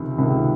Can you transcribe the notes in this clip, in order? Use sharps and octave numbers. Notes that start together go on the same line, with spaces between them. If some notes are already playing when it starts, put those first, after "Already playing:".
Already playing: C#2 C3 D#3
C#2 C3 D#3